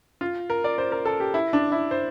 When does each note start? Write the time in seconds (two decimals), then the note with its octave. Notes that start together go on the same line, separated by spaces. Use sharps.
0.21 F4
0.50 A#4
0.64 D5
0.78 C5
0.92 A#4
1.05 A4
1.20 G4
1.34 E4
1.53 D4
1.72 E4
1.91 C5